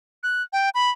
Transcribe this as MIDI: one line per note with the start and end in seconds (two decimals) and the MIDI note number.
0.23 0.43 90
0.53 0.69 79
0.75 0.90 83